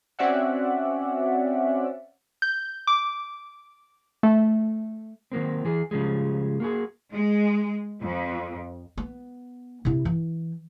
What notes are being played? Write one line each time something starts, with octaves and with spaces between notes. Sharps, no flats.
C4 C#4 F#4 D5 E5 F#5
G6
D6
A3
D#3 F#3 A#3 C4
E3 G#4
C#3 F3 G3 G#3
A#3 F#4 G#4
G#3
F2
B3
C3 E4
E3